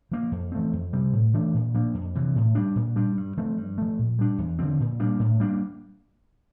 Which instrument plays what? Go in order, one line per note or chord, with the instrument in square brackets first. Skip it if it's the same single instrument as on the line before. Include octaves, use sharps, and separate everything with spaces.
[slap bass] F3 A#3
F2
E3 A3 C4
F2
C3 G3 C4
A2
E3 A3 D4
A#2
F3 A#3 D4
F2
C3 E3
A2
G3 D4
A#2
G3 D4
G2
F3 A3 C4
G2
F3 A3
A#2
G3 D4
E2
D3 F3 C4
A#2
G3 A#3 D4
A2
G3 A#3 D4